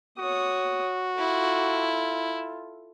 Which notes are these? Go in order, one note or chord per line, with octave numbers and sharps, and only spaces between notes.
F#4 C#5 D#6
E4 F4 A4